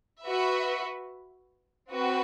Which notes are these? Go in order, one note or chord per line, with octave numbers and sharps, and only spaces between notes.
F#4 B4 E5
C4 F#4 B4